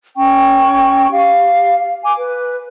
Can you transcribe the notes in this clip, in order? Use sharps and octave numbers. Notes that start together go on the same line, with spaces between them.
C#4 G5 C#6
G4 F5
F5
G#5 D6
B4